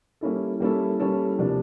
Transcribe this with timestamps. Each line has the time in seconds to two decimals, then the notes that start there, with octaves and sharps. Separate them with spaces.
0.21 G3 A#3 C#4 E4 A4
0.60 G3 A#3 C#4 E4 A4
1.00 G3 A#3 C#4 E4 A4
1.39 C3 F3 A#3 D4